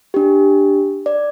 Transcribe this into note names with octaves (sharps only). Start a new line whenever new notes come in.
D4 G4
D5